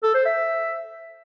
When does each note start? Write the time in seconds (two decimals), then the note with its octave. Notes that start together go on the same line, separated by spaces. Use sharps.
0.03 A4
0.14 C5
0.26 E5